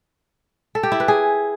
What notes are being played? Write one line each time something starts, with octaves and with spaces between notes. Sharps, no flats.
A4
G4
E4
B4
G#4